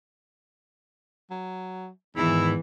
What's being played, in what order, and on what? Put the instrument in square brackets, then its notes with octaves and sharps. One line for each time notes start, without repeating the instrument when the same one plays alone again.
[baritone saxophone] F#3
[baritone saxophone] E2 [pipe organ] G#2 D#3 [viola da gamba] E3 [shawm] E4